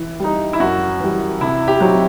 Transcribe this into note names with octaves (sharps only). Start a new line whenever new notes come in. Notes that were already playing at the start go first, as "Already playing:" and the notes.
Already playing: E3
G3 D#4
E4
F#2 F#4
E3 G3
C3 E4
G4
F#3 C4 D#4 F#4